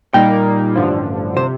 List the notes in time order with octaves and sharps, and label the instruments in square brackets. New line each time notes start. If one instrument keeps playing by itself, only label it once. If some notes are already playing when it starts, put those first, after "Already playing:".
[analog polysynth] A#2 G3 A#3 D#4 [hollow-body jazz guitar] G5
[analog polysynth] A1 G2 D3 F3
[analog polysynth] C3 [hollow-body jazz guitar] C5